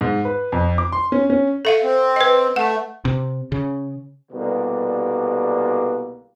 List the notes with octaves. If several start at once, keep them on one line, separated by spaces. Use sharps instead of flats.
G#2
B4
F2
D6
C6
C#4
C#4
A4 E5 F5
C4
B4 D#5
A3 F#5
C3
C#3
C2 B2 D3 G3 A#3